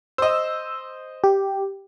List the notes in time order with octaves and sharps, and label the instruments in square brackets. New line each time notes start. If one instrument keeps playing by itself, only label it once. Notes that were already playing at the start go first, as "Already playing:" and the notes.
[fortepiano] C5 D#5 [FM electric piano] E6
[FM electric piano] G4